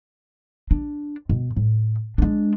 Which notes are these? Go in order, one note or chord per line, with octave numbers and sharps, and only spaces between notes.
D4
B2
A2
G#3 D4